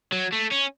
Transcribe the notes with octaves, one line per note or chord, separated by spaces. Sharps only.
F#3
A3
C#4